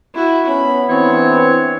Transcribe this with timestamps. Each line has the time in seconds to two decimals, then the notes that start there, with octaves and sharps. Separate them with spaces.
0.14 E4 F#4
0.47 B3 C#4 B5
0.89 E3 C4 D4 C#5